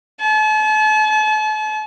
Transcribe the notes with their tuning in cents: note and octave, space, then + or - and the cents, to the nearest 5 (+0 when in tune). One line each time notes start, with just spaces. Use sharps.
A5 -40